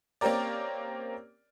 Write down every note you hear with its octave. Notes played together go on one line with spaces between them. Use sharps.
A#3 C4 C#4 G4 A#4 D5